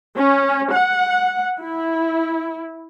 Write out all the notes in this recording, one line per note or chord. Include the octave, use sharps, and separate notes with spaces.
C#4
F#5
E4